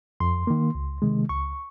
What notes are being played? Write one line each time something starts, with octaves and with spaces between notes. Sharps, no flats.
F2 C6
D#3 A#3
C#2
C3 D#3 G#3
C#2 C#6